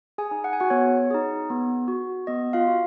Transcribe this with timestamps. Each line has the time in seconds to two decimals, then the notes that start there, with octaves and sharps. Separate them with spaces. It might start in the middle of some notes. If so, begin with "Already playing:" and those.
0.18 G#4 G#5
0.31 D#4 G#4
0.44 F#5
0.53 G#5
0.60 F#4 F#5
0.70 B3 C#5
1.11 D#4 G#4
1.50 B3
1.88 F#4
2.27 B3 D#5
2.53 F4 F5
2.67 F#4